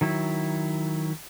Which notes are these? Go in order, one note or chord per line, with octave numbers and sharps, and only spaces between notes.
D#3 F#3 E4